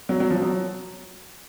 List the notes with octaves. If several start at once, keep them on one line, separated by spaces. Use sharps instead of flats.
F#3
F#3
F3
F#3